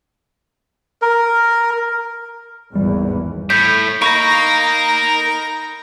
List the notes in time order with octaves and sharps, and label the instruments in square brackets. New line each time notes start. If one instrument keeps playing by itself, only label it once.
[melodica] A#4
[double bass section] G#1 E2 [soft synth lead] G3
[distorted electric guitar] A2 [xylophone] G6 [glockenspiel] B6
[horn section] D#4 A#5 [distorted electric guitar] A#4 F5 [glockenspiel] B5 G6 A#6 [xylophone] C#6